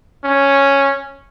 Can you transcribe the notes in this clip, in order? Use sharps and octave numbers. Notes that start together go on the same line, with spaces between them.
C#4